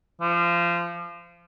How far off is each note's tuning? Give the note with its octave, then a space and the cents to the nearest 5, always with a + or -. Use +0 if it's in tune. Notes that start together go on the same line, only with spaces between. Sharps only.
F3 -25